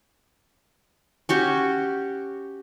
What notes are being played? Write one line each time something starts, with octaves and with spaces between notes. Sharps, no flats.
C#4 F#4 G4